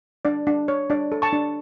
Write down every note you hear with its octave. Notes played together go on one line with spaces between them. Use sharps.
D4 D5
D4
C#5
D4 D5
A4
A5 C#6
D4